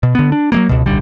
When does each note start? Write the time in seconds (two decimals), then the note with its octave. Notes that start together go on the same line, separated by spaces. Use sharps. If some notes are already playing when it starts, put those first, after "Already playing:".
0.03 B2
0.15 D3 B3
0.32 D4
0.52 F#3 G#3 A#3
0.69 C#2 B2
0.86 D1 B1 D3 G3